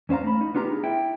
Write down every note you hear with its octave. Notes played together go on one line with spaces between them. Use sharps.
E2 C#4 C5 F5 A#5
A3 B5
D#4
B3 D4 F4 G4 A#5
G#4
E4 G5